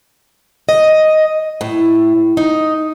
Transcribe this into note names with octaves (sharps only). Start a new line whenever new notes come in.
D#5
A2
D#4